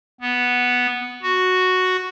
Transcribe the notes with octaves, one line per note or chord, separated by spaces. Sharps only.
B3
F#4